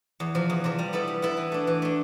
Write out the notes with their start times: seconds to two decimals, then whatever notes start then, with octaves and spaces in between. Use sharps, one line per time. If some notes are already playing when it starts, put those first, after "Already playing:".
0.20 E2
0.35 C3 F3
0.50 E2
0.64 C3 F3
0.79 G3
0.93 B3 E4 A4
1.08 G3
1.22 B3 E4 A4
1.37 E3
1.52 A3 D4
1.67 E3
1.82 A3 D4